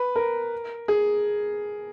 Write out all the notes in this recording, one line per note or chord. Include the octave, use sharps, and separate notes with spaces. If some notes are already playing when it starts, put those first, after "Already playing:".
Already playing: B4
A#4
G#4